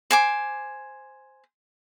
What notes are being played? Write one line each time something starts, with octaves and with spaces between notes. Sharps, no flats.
C5 G#5 D6